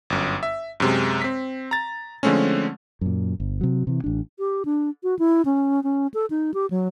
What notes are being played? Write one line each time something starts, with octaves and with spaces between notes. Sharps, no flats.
G1 F#2
E5
F#2 C3 G#3
C4 B6
A#5 A6
D3 F3 G#3 A3 C4 C#4
F#2 A#2
G1
C3 F#3
C3 E3
A1 D4
G4
D4
F#4
E4
C#4
C#4
A4
D#4
G4
F#3